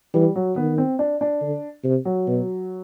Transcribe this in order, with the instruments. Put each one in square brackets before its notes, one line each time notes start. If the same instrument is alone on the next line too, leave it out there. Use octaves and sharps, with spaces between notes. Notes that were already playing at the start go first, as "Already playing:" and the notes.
[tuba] E3 [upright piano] G3
[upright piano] F#3
[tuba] D#3 [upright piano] B3
[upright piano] C4
D4
D4
[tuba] D3
C3
[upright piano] F#3
[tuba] B2